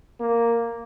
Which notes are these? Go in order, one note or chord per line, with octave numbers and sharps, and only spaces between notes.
A#3